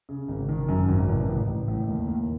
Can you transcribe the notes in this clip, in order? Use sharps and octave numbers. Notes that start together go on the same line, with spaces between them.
C#3
G#1
D#3
F#2
G#1
A1
A1
A1
A2
D#2
D#2